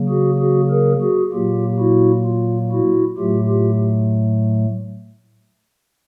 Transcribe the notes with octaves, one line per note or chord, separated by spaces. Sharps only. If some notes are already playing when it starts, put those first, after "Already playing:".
Already playing: C#3 F#3 A#3
F#4 G#4
F#4 G#4
G#4 A#4
F#4 G#4
A#2 F#3 A#3 F4 G4
E4 F#4
F4
E4 F#4
A2 F#3 A3 F4 G4
F4 G4